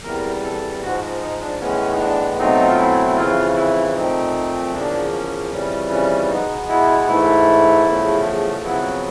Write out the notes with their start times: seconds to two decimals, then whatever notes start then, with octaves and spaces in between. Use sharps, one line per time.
0.04 E2 C3 E3 G3 A#4
0.44 A4
0.82 G#2 F3 G#3 F#4
1.21 D#4
1.41 D4
1.60 A2 E3 G#3 B3 C#4
1.93 D#4
1.99 D4
2.38 B2 F#3 A3 C4 D#4
2.67 F4
2.77 E4
3.06 E4
3.16 F2 C#3 E3 F4
3.55 E4
3.94 A#2 F3 A3 C4 D#4
4.73 E2 C#3 F3 A#3 D4
5.12 C#4
5.51 F2 C#3 E3 G3 C#4
5.90 C#4
6.29 B2 G#3 B3 D#4
6.68 E4
7.08 G#2 E3 A3 E4
7.85 E2 C#3 F3 A3
8.64 F2 C#3 F#3 B3 E4